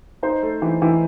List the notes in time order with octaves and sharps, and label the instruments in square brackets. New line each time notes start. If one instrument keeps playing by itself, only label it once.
[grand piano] D#4 C5
A3
E3
E3